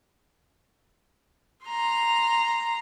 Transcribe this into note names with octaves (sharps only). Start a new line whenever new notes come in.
A#5 C6